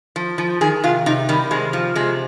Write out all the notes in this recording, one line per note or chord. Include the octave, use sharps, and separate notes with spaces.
F3
F3
D#3 G#4
C3 F4
C3 D#4
D#3 G3
C3 G#3
F3
C3 G#3